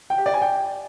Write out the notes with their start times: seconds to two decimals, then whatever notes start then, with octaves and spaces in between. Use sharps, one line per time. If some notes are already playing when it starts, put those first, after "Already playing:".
0.10 G5
0.18 G4
0.26 D5
0.34 G#5
0.42 G5